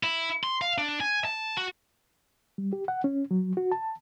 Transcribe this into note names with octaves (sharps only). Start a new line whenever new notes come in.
E4
C6
F5
D4
G#5
A5
F#4
G3
G4
F#5
C#4
F#3
F#4
A5